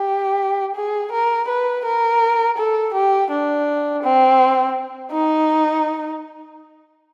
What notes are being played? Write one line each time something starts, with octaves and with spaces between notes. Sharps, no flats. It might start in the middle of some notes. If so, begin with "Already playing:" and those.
Already playing: G4
G#4
A#4
B4
A#4
A4
G4
D4
C4
D#4